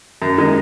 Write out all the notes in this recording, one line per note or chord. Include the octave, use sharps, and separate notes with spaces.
F#2
D#3 G#3 D#4